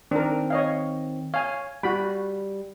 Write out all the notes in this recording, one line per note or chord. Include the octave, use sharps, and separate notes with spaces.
D#3 C4 D4 A#4
C#5 D#5 F5
C#5 F5 G#5
G3 F#4 B5